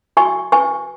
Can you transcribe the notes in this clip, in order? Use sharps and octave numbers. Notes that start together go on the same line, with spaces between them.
F#4 G#5 C#6
B4 G#5 C#6